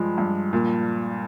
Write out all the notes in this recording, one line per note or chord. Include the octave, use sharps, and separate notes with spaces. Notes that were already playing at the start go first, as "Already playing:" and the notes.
Already playing: G2 F3 G#3
G2
A#2